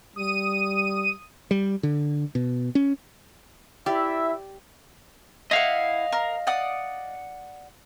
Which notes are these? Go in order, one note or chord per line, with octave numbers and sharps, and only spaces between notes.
G3 D#6 D#7
G3
D3
B2
C#4
E4 G4 D5 E5
E4 D#5 F5 F#5
A#4
D5 F#5 D#6